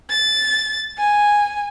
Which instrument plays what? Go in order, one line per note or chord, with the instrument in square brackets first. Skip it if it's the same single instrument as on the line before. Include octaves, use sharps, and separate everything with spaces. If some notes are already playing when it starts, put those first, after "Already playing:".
[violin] A6
G#5